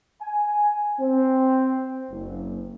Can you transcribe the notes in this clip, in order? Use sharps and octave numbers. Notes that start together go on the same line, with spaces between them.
G#5
C4
F#1